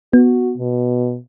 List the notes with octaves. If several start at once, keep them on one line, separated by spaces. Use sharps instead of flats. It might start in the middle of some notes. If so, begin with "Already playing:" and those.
B3 F#4
B2